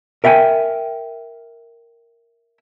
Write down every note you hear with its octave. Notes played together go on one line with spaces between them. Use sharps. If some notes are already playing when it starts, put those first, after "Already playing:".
A#4 E5 F5 G5 G#5